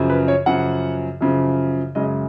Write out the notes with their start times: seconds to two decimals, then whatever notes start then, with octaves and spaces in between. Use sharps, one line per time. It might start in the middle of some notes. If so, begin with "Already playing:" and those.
Already playing: F#2 C#3 F3
0.10 B4
0.28 C#5
0.46 F#2 C#3 F3 F#5
1.21 F#2 C#3 F3
1.95 F#2 C#3 G#3 D#5